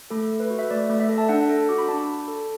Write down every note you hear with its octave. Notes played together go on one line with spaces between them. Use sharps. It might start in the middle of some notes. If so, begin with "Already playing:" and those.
A3 A4
A4
B4
F#4
E5
A3 D5
A3
E5
A4
A5
D4 F#5
A4
F#4 D6
B5
D4 A5
D4
A4